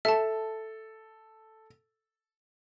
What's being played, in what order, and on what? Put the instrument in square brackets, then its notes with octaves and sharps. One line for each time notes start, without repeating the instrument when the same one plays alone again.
[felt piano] A4 [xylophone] E5 A5